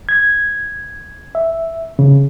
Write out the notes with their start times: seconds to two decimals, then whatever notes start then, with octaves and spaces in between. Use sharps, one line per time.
0.09 G#6
1.35 E5
1.99 C#3